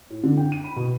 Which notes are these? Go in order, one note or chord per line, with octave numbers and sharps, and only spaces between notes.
A2
D3
G5
D#7
B5
B2